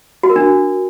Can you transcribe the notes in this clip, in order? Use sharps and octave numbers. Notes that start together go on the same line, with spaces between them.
F#4
A#4
D4